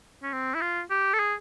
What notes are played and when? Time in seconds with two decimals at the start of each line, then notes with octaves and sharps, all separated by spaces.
0.23 C#4
0.33 C4
0.55 E4
0.62 F4
0.90 G4
1.14 A4
1.19 G#4